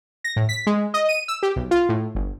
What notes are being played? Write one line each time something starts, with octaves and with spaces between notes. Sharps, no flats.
A#6
A2
B6
G#3
D#5
D#7
E6
G4
B1
F4
A2
G1